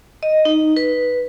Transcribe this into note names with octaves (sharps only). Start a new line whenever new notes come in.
D#5
D#4
B4